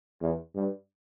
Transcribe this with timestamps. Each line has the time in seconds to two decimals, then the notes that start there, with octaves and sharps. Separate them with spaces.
0.21 E2
0.54 G2